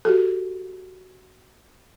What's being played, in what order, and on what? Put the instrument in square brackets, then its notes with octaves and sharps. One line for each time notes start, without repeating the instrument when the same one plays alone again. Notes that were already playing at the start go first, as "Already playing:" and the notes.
[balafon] F#4 G4 A4